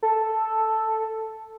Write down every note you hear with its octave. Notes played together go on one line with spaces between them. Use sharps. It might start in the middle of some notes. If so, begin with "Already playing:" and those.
A4